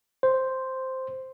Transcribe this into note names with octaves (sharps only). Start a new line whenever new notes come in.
C5